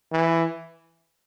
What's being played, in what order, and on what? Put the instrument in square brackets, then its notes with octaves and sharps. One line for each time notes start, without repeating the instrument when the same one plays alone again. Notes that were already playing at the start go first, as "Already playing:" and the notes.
[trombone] E3